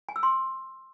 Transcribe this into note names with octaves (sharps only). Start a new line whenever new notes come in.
G#5
E6
C6